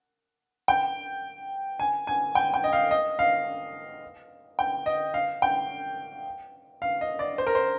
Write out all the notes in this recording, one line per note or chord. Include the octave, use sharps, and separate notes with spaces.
G5
G#5
G#5
G5
G5
D#5
F5
D#5
F5
G5
D#5
F5
G5
F5
D#5
D5
C5
A#4
C5